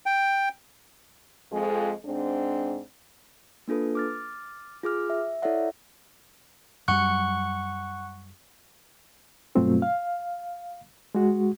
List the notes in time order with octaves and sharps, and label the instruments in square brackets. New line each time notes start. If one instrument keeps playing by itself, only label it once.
[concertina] G5
[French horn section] F2 G#3
G#2 C4 D4
[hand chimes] A#3 D4 F4 A4 B4
D6 F6 A6
F4 G#4 D6 F6
E5
E4 A4 C#5 D5 E5 F#5
[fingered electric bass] F#2 F#3 G3 [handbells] F#5 C#6 F#6
[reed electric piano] G2 B2 F#3 A3 C4 F4
F5
G#3 F#4